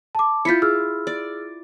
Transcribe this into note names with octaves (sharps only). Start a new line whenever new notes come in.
A5 D6
E4 F4 G6 B6 C#7
G#4 E6 F6
D5